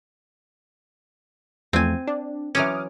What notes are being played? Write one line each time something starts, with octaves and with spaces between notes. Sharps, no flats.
E2 F3 A3 C4 G#5
D4
E3 F#3 C#4 D6 D#6 F6